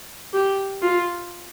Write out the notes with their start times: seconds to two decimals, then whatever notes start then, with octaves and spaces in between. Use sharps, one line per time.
0.34 G4
0.82 F4